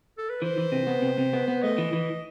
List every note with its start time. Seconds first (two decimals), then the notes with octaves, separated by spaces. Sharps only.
0.18 A4
0.29 B4
0.42 E3 C5
0.58 E3
0.72 C3
0.87 B3
1.02 C3
1.18 C3
1.33 B3
1.48 B3
1.63 A3 D#5
1.78 E3
1.93 E3